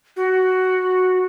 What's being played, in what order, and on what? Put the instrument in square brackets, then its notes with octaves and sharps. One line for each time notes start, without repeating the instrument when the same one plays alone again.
[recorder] F#4